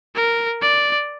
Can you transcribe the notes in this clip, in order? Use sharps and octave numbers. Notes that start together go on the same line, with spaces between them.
A#4
D5